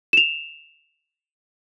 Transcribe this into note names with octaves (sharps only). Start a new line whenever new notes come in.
E7 F7